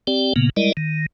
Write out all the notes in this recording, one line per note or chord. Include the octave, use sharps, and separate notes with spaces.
C4 G4 D5 G5
A#2 C#3 A#3 B3
G3 G#3 E4 A#4 D5 D#5
D#3